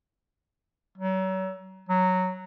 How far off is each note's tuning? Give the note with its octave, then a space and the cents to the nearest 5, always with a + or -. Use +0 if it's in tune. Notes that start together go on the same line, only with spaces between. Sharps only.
F#3 +35
F#3 +0